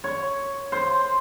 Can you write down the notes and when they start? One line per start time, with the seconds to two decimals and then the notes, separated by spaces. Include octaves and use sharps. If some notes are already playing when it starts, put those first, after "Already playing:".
0.04 C#5
0.72 C5